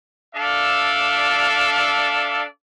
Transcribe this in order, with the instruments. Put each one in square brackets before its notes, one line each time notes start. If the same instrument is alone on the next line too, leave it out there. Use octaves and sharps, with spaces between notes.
[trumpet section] D4 A4 D5 E5 F5